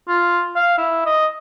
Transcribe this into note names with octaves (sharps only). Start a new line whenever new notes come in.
F4
F5
E4
D#5